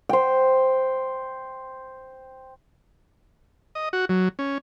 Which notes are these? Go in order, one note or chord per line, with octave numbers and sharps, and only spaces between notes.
C5 G5
D#5
F#4
F#3
C#4